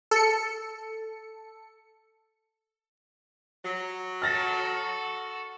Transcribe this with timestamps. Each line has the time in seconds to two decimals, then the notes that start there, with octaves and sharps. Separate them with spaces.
0.11 A4 C#7
3.64 F#3
4.22 F#4 A4 F6 A6 A#6